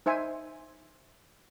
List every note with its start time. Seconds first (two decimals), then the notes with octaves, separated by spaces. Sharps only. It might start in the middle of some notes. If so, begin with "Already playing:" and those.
0.06 D#4 C5 E5 G#5